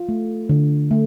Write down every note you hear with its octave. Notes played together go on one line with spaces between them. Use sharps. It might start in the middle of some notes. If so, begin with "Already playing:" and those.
Already playing: F4
A3
D3
A3